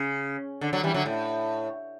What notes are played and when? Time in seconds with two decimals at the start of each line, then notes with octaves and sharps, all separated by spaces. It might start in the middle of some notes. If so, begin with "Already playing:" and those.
Already playing: C#3
0.61 D3
0.73 D3 F#3
0.83 E3 G3
0.94 D3 F#3
1.06 A2